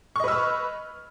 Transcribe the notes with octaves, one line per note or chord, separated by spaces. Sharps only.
B4 D#5 C#6 E6 F6